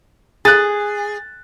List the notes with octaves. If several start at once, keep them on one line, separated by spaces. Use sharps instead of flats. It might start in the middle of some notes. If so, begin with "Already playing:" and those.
G#4 F#6 A6